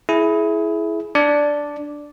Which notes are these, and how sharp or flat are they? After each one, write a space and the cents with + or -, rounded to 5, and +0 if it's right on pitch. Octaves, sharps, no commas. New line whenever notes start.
E4 +0 G#4 +25
D4 +0 D5 -5